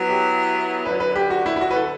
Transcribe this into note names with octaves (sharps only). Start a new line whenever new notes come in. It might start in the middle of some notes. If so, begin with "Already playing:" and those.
Already playing: F#3 B3 E4
G4
F#2 D3 F#3 B4
B4
G4
F#4
E4
E4
F#4
B4
A4